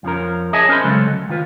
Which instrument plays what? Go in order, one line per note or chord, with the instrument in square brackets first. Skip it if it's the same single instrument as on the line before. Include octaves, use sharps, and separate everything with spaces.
[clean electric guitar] F2 F3 C#4 A#4
G#4 C#5 D#5 E5 G#5 A5
C#4 A#4 C5 B5 C6
C#3 F#3 G#3 A4 C#5
D2
D#3 F4 B4